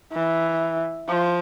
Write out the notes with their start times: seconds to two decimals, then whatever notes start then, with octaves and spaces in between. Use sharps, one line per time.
0.13 E3
1.09 F3